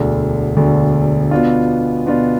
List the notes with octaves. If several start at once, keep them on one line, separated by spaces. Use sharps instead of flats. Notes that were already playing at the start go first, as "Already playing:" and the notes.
Already playing: E1 D2 D3
E1 D2 D3
B2 B3 D4 F4
B2 B3 D4 F4